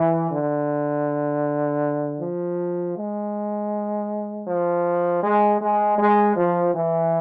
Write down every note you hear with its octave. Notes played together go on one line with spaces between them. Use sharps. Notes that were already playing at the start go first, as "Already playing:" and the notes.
Already playing: E3
D3
F3
G#3
F3
G#3
G#3
G#3
F3
E3